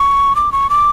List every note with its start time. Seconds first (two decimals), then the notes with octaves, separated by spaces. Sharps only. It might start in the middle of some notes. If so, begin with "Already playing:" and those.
Already playing: C#6
0.36 D6
0.52 C#6
0.70 D6